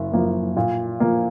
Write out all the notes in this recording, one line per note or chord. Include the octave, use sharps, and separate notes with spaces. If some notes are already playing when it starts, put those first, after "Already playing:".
Already playing: F#1 F#2
F#2 F3 A#3
A#2
F3 A#3